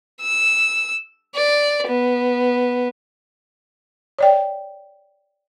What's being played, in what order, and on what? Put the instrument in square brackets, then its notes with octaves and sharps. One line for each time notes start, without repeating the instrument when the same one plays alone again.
[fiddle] E6
D5
B3
[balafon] C#5 D5 G5